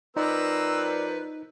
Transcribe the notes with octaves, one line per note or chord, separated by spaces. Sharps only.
F3 C4 D#4 A#4 B4 D5 A#5 E6